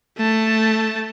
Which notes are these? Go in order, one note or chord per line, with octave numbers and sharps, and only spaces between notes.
A3 A5